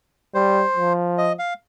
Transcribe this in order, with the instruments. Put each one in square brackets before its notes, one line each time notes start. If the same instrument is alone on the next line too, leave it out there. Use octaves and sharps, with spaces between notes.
[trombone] G3 [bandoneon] C5
[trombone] F3
[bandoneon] D#5
F5